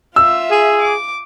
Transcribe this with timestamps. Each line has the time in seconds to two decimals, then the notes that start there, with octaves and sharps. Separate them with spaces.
0.16 F4 E5 E6
0.51 G#4
0.82 D6